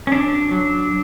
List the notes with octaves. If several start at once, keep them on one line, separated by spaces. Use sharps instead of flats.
C#4
F#3 D4
F#3